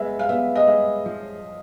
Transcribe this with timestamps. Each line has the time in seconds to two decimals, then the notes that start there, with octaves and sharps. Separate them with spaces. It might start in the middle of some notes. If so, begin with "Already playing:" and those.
Already playing: G#3 B3 E5
0.19 F5
0.29 B3 E5
0.55 D#5
0.67 G#3 E5
1.06 F3